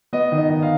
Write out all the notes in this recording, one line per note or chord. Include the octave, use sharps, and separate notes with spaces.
B3 D#5
D#3
D#5
D#3
F5